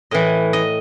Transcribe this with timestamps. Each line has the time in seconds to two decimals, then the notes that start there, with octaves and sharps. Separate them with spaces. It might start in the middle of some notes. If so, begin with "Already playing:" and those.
0.11 A2 E3 D#5
0.53 D#5